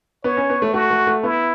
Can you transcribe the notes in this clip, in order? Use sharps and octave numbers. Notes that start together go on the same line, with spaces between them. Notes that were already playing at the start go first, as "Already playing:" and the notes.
B3 C#5
C#4
B3
A3
A3 F#4
A3
A3
B3 E4